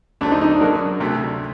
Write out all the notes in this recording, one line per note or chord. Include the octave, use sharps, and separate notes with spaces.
D3 F#3 A3 C4 D4
D#4
D#4
D4
F#2 F#3 A#3 F#4 A#4
D2 C3 F#3 A3